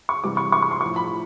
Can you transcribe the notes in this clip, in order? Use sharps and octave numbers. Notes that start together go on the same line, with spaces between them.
C#6
C3 E3 G3 D6
C#6
C#6
C#6
C6
A2 F3 C#6
B5